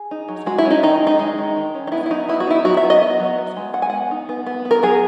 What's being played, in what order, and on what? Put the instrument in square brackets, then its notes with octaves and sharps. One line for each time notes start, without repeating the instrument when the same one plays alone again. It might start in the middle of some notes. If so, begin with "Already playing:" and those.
Already playing: [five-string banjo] G#4
D#4
F#3
G#3 F#4
E4
C#4
D#4
D#3 D#4
G#3
D#4
G#3
D#3
D#3
C#4
D#4
B3 E4
E4
F#3 D#4
B3 E4
F#4
D#4 E4
F#3 F#4
E5
B3
D#5
B3
F#3
B3
G#3
G#3 F#5
G#5
B3 F#5
D#4
B3
B3
B3
A#4
F#3 G#4